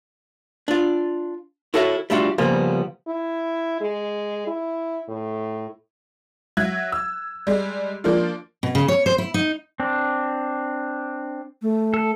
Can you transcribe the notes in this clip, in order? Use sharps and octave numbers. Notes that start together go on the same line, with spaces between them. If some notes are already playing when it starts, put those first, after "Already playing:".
D4 F4
E4 F#4 A4 C#5 D5 E5
G3 A3 D4 F4 F#4
C#3 F3 G3 A#3 B3
E4
G#3
E4
A2
F#3 E5 F#6 G#6
E6
G3 G#3
F3 A#3 D4 F4
B2
C#3
C#5
C5
E4
D#4
C4 D4
A3
A4